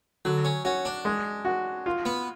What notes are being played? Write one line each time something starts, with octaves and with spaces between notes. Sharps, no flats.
D3 F#3
C#4
C#4 F#4
D4
G#3
F#4
F4
B3